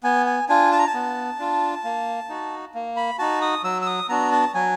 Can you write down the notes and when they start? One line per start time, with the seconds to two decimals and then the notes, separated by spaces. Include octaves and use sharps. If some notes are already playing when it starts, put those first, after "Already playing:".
0.03 B3 G#5
0.26 G#5
0.49 D4 F4 G#5
0.71 A5
0.79 A#5
0.87 A5
0.94 B3
1.39 D4 F4
1.84 A#3
2.29 D#4 F#4
2.74 A#3
2.96 B5
3.19 D#4 F#4 A5
3.42 D#6
3.64 F#3 E6
3.82 E6
3.87 D#6
4.09 B3 D4 F#4 A#5
4.32 A5
4.54 F#3 G#5